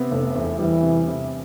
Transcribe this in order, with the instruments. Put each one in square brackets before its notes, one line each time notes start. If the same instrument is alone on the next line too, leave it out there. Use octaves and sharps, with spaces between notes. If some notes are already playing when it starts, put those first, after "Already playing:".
Already playing: [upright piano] C3 B3
F1
E2
[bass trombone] E3 [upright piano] G3
[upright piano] C3
C3